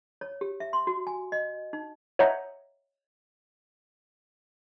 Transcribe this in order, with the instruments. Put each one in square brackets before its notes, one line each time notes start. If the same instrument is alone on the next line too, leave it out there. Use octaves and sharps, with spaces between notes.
[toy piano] C#5
G4
E5
C6
F#4
G#5
D#5
D#4
[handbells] C#5 D#5 E5 F#5 A#5 G6